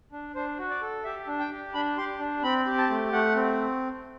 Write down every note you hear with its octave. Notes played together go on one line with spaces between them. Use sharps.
D4
D4 C5
F#4
D5
A4
G4 E5
D4
G5
G4
D4 B5
G4 C6
D4
C4 B5
G4
A5
A3
A3 F#5
C4